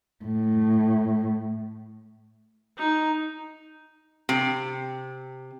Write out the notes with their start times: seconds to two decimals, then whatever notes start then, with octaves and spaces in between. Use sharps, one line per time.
0.25 A2
2.79 D#4
4.29 C3